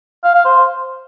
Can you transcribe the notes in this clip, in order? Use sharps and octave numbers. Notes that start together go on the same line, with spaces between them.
F5
F5
C5